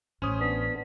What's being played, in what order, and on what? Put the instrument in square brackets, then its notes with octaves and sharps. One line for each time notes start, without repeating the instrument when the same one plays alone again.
[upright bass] A1 [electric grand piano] C#4 D#6 [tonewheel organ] C5 C#5
[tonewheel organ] B3 D4 [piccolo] B6